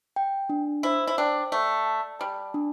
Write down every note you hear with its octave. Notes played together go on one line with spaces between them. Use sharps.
G5
D4
E4 C5
E4
D4 G5
A3 D5
A5
G3 A5
D4